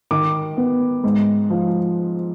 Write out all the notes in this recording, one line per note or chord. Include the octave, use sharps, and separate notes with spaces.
D#3 D6
B3
G#2
F3